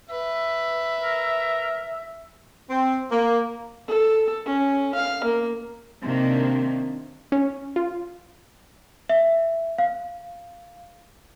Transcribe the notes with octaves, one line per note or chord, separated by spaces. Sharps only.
B4 E5
A#4
C4
A#3
A4
C#4
F5
A#3
C3 D#3 A#3 D4
C#4
F4
E5
F5